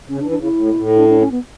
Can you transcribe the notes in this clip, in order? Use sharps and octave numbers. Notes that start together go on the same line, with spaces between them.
C#3 C#4
D4
E3
D4
C#3 E4
A2
B2
A2
D4
D4
C#4
B3